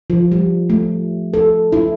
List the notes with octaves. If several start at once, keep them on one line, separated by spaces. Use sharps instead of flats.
F3
G3
A3
A4
E4